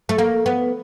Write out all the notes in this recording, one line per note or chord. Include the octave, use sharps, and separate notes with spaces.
A3
A#3
B3